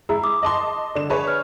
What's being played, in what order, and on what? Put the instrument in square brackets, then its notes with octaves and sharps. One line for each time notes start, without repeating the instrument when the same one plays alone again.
[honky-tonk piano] G#3 E4 [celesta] G#4 A#5
[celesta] D6 D#6
[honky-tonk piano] D#5 A5 C6
[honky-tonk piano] D3 E7 [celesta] D5
[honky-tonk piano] G#4 B4 C#5
[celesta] F6